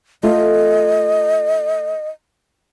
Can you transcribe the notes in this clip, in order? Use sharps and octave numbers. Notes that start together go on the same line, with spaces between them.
A3 F4 D#5